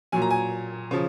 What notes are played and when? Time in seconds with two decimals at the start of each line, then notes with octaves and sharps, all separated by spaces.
0.12 A#2 F#3 G#5
0.22 A#5
0.31 G#5
0.91 C#3 F3